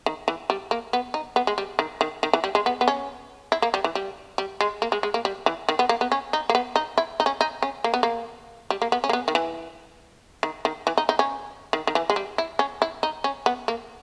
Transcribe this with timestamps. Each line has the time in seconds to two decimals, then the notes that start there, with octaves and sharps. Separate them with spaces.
0.06 D#3
0.28 E3
0.50 G3
0.71 A#3
0.93 B3
1.14 D#4
1.36 B3
1.47 G#3
1.58 G3
1.79 D#3
2.01 D#3
2.23 D#3
2.33 E3
2.44 G3
2.55 G#3
2.66 B3
2.81 B3
2.88 C#4
3.52 E4
3.62 A#3
3.74 G3
3.84 E3
3.95 G3
4.38 G3
4.61 G#3
4.82 A#3
4.92 G#3
5.03 G#3
5.14 A#3
5.25 G3
5.46 E3
5.69 D#3
5.79 B3
5.89 A#3
6.01 B3
6.12 C#4
6.33 D#4
6.50 A#3
6.55 B3
6.76 D#4
6.98 E4
7.20 D#4
7.26 C#4
7.41 D#4
7.63 C#4
7.84 A#3
7.94 B3
8.03 A#3
8.70 G3
8.82 A#3
8.92 B3
9.04 C#4
9.09 A#3
9.13 B3
9.28 D#3
9.35 E3
10.43 D#3
10.65 D#3
10.87 E3
10.98 D#4
11.09 D#4
11.19 C#4
11.73 D#3
11.87 D#3
11.95 E3
12.10 G#3
12.16 G3
12.38 E4
12.59 C#4
12.82 E4
13.03 D#4
13.24 C#4
13.46 B3
13.68 A#3